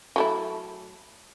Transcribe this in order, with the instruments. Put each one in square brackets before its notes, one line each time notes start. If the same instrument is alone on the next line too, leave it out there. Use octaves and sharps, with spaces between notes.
[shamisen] F#3 A3 E4